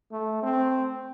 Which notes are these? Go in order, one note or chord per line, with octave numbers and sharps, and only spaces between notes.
A3
C4